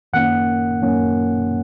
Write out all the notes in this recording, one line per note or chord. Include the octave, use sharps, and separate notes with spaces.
F#2 D#3 A#3 C#4 F#5
F#2 D#3 A#3 C#4